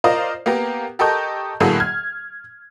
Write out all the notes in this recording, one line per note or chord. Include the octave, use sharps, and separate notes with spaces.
F4 A#4 C5 D5 D#5 F5
A#3 B3 G4 A#4
G4 A4 A#4 D#5 C#6 G6
A2 D3 F#3 A#3 G#4 A4
F6 G#6